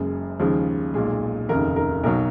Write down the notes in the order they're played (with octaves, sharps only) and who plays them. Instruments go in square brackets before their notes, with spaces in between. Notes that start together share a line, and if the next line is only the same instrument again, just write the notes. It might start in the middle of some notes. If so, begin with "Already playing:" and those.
Already playing: [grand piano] F#1 F#2 C#3 G#3 G#4
D#2 C#3 F3 G#3
B1 A#2 G#3
F1 D#2 C#3 A#4
A#4
B1 B2 F#3 A#4